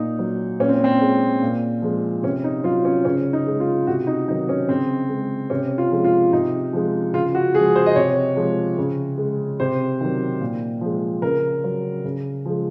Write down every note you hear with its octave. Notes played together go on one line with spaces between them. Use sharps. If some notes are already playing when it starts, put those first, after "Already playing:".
Already playing: A#2 D#4
F#3
A#2 C#4
C4
C4
G#3
A#2
F3 G#3
C3 C#4
D#4
F#3 F4
C#4
C#3 C#4
D#4
G#3
F4
C3 F#4
D#4
D#3 F#3 D#4
C#4
C#3 C4
G#3
C3 C#4
F4
F3 G#3
F4
C3 D#4
F3 G#3
C#3 F4
F#4
F3 G#3 G#4
C5
D#5
C3 C#5
F3 G#3
C#3
G#3
C3 C5
D#3 F#3
A#2
F3 G#3
C#3 A#4
F#3
C#3
F3 G#3